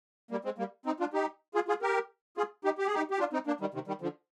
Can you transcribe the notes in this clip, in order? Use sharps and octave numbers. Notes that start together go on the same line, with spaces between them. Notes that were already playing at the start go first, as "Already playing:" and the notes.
G3 A#3
G#3 C4
G3 A#3
C4 D#4
D4 F4
D#4 G4
F4 G#4
F4 G#4
G4 A#4
F4 G#4
D#4 G4
G4
G#4
D#4 G4
G4
D4 F4
C4 D#4
A#3 D4
D#3 G3
C3 D#3
D#3 G3
D3 F3